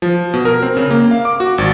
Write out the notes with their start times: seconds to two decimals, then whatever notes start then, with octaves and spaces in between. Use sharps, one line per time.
0.02 F3
0.34 B2
0.45 A#4
0.62 C4
0.77 C#3
0.91 A#3
1.11 F5
1.25 D6
1.40 F#4
1.58 G#1